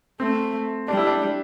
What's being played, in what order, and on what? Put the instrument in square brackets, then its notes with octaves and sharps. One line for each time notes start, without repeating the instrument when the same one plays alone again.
[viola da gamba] A3 [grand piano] C4
[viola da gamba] G3 [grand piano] D4
[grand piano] E4
D4